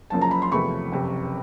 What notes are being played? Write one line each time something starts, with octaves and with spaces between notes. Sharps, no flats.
F#1 F#2 C#3 F3 A#3 A5
A#5
B5
C6
E2 C3 F3 A3 B5 C#6
F#1 F2 C3